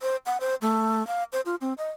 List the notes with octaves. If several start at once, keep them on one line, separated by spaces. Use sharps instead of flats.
C5
F#5
C5
A3
F5
C5
F4
C4
D#5